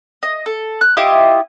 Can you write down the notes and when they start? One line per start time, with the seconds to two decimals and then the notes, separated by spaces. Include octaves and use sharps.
0.23 D#5
0.46 A4
0.81 F#6
0.97 E4 F4 G4 D#5